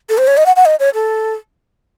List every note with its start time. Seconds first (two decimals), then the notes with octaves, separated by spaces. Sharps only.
0.09 A4
0.18 C5
0.27 C#5
0.37 D#5
0.46 F#5
0.56 F#5
0.65 D#5
0.80 C#5
0.94 A4